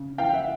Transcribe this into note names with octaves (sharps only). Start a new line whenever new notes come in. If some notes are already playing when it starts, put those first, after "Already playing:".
Already playing: C#3
E3 F5 G5
E5 F#5